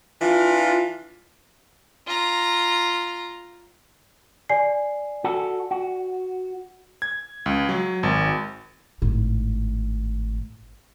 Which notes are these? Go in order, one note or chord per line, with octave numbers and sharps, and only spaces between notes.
E3 D4 F4
F4 A#5
D5 G#5 C7
F#4 A4
F#4
G#6
C#2
F#3
G#1
G#1 A2